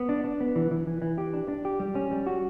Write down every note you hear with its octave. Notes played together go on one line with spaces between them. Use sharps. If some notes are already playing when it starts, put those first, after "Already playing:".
Already playing: B3
D4
D4
B3
E3
E3
E3
E3
G4
D4
D4
G4
G3
C#4
G3
F#4